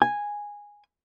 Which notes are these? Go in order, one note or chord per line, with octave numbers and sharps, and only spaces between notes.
G#5